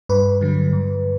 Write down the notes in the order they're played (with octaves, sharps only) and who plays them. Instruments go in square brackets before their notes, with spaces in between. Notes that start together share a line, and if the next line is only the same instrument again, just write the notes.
[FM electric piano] G2 B4
D3 F#3
G2